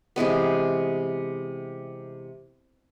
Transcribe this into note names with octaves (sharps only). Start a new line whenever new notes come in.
C3 E3 G#3 B3